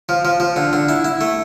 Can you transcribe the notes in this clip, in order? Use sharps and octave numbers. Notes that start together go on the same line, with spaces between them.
F3
F3
F3
D3
D3
E4
E4
A3